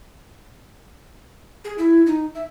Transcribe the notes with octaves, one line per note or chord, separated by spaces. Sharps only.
G#4
E4
D#4
E5